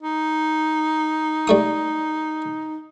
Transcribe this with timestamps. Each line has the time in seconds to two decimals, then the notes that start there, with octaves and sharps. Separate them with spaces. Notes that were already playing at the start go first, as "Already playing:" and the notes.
0.03 D#4
1.47 G3 A3 D#6